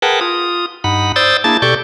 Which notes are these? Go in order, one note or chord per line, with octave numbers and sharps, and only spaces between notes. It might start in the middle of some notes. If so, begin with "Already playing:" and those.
G#4 A#4 B4 F#5 G5 A5
F4 D#6
G2 D#4 F#5 B5
C5 D5 D#6 E6 G6 A6
A#3 D4 E4 G#4 A5 A6
B2 G4 A4 D5 C#6 G6